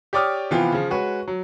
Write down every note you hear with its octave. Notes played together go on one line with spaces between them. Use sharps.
G4 C#5 D5 D6 D#6 F6
C3 E3 F3 B3 F4 G4
C#3 F3
G#3 F#4 B4 C#5
F#3